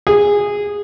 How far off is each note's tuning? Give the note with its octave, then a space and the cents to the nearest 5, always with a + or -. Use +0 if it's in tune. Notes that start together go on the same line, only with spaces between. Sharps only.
G#4 -15